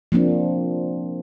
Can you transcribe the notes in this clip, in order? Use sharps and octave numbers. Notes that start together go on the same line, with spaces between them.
F3 A#3 C4 D4